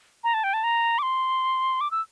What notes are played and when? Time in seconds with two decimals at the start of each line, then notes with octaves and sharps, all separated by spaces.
0.24 A#5
0.34 A5
0.44 G5
0.54 A5
0.64 A#5
0.99 D6
1.03 C6
1.81 D6
1.91 E6